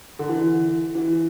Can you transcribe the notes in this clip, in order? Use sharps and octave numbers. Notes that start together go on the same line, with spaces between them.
D3
E3
E3